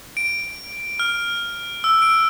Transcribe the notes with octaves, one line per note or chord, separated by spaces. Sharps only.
D7
F6
E6
D7